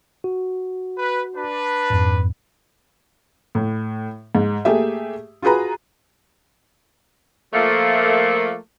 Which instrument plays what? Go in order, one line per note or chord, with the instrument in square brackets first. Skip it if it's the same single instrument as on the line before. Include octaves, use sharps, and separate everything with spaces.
[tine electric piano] F#4
[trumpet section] B4
D4 B4
[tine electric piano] F2 G#2
[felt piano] A2
G#2
A3 A#3 G4 G#4 E5
F4 F#4 G#4 B4 A#5
[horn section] F3 A3 A#3